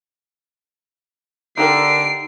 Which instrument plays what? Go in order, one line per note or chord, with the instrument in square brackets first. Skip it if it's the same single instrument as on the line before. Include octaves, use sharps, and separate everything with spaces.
[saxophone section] D3 [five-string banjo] D#4 G4 A#4 [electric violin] C7 [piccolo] D7